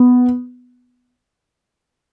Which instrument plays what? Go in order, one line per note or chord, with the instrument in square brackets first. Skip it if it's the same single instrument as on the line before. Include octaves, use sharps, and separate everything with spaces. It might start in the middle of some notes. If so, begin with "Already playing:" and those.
Already playing: [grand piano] B3